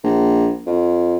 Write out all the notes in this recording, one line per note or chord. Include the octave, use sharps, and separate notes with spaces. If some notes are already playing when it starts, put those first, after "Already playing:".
A#1
F2